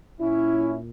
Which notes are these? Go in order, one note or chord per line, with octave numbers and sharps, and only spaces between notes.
A#2 C#4 E4